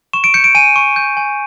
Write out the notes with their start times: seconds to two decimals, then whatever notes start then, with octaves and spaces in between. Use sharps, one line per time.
0.13 C#6 E7
0.24 D7
0.34 G6 C#7
0.44 D7
0.55 G#5 D#7
0.76 C#6
0.96 G6
1.17 G#5